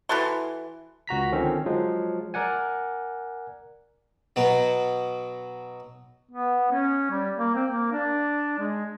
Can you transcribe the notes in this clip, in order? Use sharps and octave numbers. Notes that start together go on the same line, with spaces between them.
E3 F#4 A4 C6
C#2 F#4 A#5 B6
D3 D#3 F3 C4 C#4
F3 F#3 G#3
A#4 D5 F#5 G#5
B2 F#3
B3
C#4
G3
A#3
C4
A#3
D4
G#3